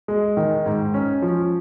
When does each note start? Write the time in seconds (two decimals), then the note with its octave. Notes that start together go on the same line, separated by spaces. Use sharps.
0.08 G#3
0.37 D#3
0.66 G#2
0.94 C#4
1.22 F3